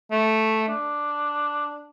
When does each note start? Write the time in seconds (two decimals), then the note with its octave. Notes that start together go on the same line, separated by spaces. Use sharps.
0.11 A3
0.68 D4